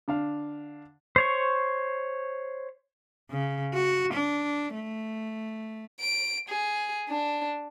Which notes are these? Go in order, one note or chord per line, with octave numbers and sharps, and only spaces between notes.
D3 D4 F5
C5 C#5 C#6
C#3
F#4
D4
A3
D7
G#4
D4